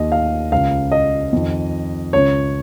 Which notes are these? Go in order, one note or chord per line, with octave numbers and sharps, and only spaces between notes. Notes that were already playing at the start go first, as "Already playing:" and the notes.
Already playing: D#2 D#3 D#5
F5
C#2 C#3 F5
D#5
F2 D#3
C#2 C#3 C#5